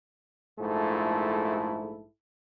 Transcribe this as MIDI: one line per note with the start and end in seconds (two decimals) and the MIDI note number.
0.59 2.05 34
0.59 2.05 44
0.59 2.05 57
0.59 2.05 64
0.59 2.05 65
0.59 2.05 69